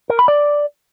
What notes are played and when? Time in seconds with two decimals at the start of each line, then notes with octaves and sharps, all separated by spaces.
0.10 A#4
0.19 B5
0.28 D5